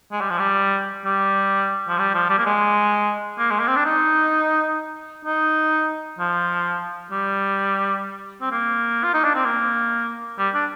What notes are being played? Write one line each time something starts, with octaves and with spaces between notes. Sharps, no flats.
G#3
G3
F3
G3
G3
F3
G3
F3
G3
A#3
G#3
A#3
G#3
A#3
C4
D4
D#4
D#4
F3
G3
C4
A#3
F4
D#4
D4
C4
A#3
G3
D4